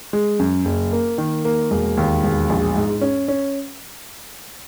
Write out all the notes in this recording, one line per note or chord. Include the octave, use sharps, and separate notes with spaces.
G#3
F#2
F#1
A#3
D#3
A#3
E1
D#2
E1
A#1
G#2
C#4
C#4